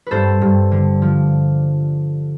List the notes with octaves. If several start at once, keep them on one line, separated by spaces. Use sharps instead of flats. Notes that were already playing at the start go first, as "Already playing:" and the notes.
G2 A4 B4 C5
G2
D3
F3